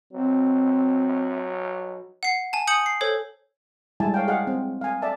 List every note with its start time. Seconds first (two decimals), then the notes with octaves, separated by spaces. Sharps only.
0.13 F#3 C4
2.23 F#5 C7
2.53 G#5 A5
2.67 G#5 D#6 G6 C#7 F#7
2.86 C7
3.01 A4 C5 C#5
4.00 G3 G#3 E4 G#5 A5
4.14 C#5 F5 G5
4.28 G#4 D#5 F5 F#5
4.47 C4
4.81 F5 G#5
5.02 D5 E5 A5